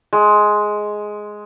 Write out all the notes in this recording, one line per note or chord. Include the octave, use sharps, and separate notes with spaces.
G#3